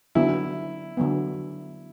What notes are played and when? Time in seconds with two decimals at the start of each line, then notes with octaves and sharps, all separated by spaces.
0.15 D3 F#3 B3 E4
0.97 D3 F#3 B3